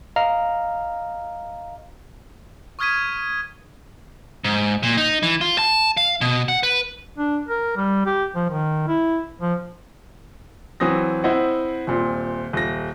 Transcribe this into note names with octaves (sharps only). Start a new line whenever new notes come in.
D#5 F5 A#5 F6
C#6 D#6 F6 G#6 B6 D#7
G#2
A#2
D#4
E3
F4
A5
F5
B2
F#5
B4
D4
A#4
G3
G4
F3
D#3
E4
F3
E3 F#3 C4 D#6 A#6
C4 E4 C5 D#5 F#5
D#1 A#2 C4
D#1 A#6